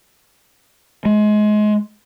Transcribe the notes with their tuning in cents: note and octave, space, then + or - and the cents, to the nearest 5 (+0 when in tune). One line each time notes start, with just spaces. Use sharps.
G#3 +25